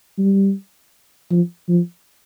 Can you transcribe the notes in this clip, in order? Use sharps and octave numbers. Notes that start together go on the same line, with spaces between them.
G3
F3
F3